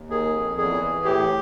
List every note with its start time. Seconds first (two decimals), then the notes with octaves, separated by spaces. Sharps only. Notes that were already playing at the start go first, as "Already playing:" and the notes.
Already playing: D#2
0.10 D#3 G#4
0.34 F2
0.58 E2 G#4
0.81 E3
1.05 A2 G4